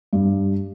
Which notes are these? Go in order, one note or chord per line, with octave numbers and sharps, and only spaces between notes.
G2